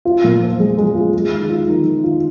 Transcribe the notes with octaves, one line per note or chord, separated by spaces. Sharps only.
F4
A#2
F3
G#3
G#3
F4
G#3
D#3
F4
D#3
D#3
F4